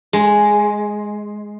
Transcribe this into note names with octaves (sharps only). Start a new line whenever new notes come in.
G#3